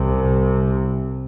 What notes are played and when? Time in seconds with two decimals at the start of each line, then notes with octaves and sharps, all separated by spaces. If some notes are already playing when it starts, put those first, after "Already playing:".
Already playing: C2 C3